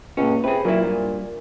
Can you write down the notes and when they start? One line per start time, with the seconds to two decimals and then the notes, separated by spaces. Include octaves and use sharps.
0.17 C#2 A#2 C#4
0.44 C3 G#4 B4
0.65 A#2 F#3 E4
0.83 G2